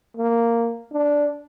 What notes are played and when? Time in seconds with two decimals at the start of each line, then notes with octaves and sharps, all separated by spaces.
0.17 A#3
0.93 D4